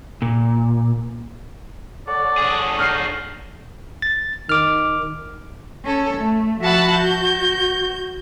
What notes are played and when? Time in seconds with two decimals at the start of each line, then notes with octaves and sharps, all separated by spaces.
0.22 A#2
2.07 A4 C#5 D5 F#5
2.38 D4 G#4
2.79 D#4 F6 C7
4.02 A6
4.49 D#3 D6 F6
5.83 C#4 A4
6.16 A3
6.60 F3 F#4 E5 F#5 A5 B5
6.94 F#4 G6